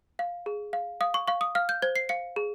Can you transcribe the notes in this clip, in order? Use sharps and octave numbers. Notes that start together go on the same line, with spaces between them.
F5
G#4
F5
F5 D#6
C#6
F5 C#6
D#6
F5 F6
G6
C5 G#6
C7
F5 C#7
G#4